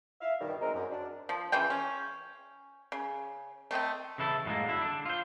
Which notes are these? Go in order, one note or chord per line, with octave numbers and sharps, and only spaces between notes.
E5 F5
C#2 G2 B2 D#3 G3
A2 G#3 C4 A#4 D#5 A#5
F#2
D4
F3
C#3 E3 F4 G5
C#4
C#3
A3 C4 D#5 G5
C#3 E3 E4 A4
F#2 A2 F#3 G#3 A#3
D3 E4
D3 D4
F4 C5